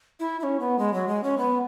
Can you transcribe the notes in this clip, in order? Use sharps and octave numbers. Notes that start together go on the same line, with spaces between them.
E4
E4
C#4
B3
G#3
F#3
G#3
C#4
B3